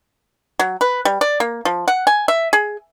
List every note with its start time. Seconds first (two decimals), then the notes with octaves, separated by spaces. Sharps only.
0.59 F#3
0.81 B4
1.05 G3
1.21 D5
1.40 A#3
1.65 F3
1.88 F#5
2.07 G#5
2.28 E5
2.53 G#4